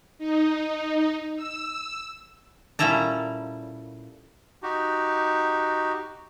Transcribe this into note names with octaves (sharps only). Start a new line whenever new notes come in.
D#4
E6
A#2 G3 C#4 E4 A4 A#5
D#4 F#4 G4